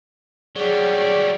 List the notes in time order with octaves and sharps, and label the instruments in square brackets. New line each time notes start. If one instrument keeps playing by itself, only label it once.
[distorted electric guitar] F#3 G3 [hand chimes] G#4 [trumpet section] C#5 D5